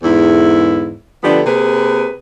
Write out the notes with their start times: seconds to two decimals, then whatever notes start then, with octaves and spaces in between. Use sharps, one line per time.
0.03 E2 G#2 D3 E4
1.23 D3 F3 A3 B3 D4 G4
1.46 C3 A#3 G#4 B4